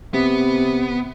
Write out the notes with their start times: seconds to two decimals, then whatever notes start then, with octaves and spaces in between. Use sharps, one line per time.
0.14 C3 B3